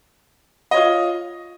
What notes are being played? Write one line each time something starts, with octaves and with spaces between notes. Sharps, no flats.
F4 C#5 D#5